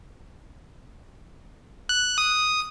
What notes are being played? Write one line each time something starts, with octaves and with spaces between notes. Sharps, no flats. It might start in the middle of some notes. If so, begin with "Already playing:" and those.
F#6
D#6